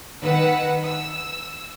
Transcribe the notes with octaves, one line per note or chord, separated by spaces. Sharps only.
D#3 B4 F#5 E6
E6